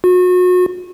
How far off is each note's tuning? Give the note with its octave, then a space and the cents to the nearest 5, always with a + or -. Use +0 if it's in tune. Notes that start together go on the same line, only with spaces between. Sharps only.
F#4 -35